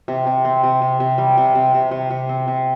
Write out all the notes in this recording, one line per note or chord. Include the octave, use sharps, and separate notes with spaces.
C3
C3
C4
C3
C3
C3
G3
C3
C3
C3
C3
C3
C4
C3